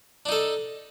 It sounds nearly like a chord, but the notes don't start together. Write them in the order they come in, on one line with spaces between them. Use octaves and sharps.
D4 D#4 A4